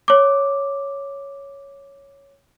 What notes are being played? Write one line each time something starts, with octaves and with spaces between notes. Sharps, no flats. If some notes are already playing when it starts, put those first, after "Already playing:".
C#5 D6